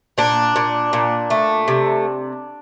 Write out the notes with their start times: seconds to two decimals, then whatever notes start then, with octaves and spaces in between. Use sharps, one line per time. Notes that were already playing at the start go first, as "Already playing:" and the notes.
0.18 A#2 D4
0.56 A#2
0.93 A#2
1.30 A3
1.68 C3